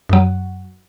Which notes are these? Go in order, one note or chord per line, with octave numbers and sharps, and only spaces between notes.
F#2 F#3